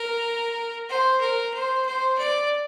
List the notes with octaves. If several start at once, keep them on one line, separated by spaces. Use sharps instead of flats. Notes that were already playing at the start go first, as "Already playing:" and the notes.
Already playing: A#4
C5
A#4
C5
C5
D5